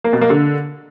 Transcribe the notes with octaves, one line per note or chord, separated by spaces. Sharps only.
A#3
B2
A#3
D3